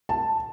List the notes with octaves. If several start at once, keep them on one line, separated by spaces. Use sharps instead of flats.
A5